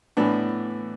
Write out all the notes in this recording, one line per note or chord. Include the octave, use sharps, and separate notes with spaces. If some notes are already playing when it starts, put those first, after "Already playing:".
A2 E3 B3 D4